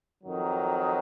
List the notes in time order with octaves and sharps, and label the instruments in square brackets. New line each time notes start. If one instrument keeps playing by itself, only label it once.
[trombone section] F2 D#3 F#3